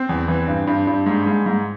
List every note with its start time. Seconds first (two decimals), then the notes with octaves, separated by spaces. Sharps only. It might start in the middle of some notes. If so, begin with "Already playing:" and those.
Already playing: C4
0.09 E2
0.28 E3
0.47 G2
0.67 G2
0.87 G2
1.06 G#2
1.26 G#2
1.46 G#2